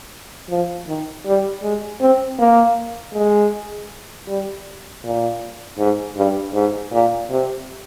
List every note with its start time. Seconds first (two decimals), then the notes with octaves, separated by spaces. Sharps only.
0.49 F3
0.87 D#3
1.26 G3
1.63 G#3
2.01 C4
2.39 A#3
3.14 G#3
4.28 G3
5.04 A#2
5.79 G#2
6.17 G2
6.54 G#2
6.92 A#2
7.30 C3